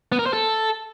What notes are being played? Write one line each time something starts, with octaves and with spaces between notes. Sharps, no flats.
B3
A#4
C5
A4